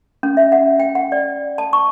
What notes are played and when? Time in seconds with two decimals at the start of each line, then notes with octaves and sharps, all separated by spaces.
0.23 C#4
0.37 E5
0.52 F#5
0.80 G5
0.95 F#5
1.12 D5
1.58 A5
1.73 C#6